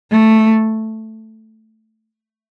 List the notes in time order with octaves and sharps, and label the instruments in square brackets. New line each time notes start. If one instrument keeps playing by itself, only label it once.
[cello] A3